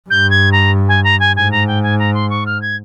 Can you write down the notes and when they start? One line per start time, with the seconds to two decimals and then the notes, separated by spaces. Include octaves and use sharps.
0.10 G2 G6
0.31 G#6
0.52 A#5
0.89 G#5
1.04 A#5
1.20 G#5
1.36 G#2 G#5
1.52 A#5
1.67 G5
1.83 G#5
1.99 A#5
2.14 C6
2.30 C#6
2.46 F6
2.62 G#6